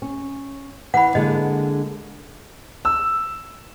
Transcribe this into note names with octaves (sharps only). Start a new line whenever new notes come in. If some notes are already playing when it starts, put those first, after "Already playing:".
C#4
E3 F#5 B5
D3 G#3 A#3 D#5
E6